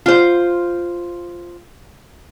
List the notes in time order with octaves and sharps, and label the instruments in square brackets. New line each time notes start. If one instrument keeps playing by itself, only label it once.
[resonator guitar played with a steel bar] F4 C5